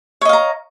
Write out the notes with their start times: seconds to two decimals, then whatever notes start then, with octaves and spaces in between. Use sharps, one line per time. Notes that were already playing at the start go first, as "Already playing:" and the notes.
0.21 C#5
0.25 D#5
0.29 F5
0.33 A#5